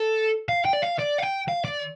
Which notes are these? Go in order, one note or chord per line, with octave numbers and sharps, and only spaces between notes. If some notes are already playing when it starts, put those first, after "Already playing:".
Already playing: A4
F5
G5
D5
F5
D5
F5
G5
F5
D5